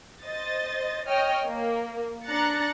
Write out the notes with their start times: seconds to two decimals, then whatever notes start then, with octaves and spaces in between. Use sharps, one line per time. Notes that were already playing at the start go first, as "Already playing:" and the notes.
0.24 C5 D#5 A6
1.07 C#5 D#5 G5 F6
1.46 A#3
2.25 D4 A#5 F#6 A6 C#7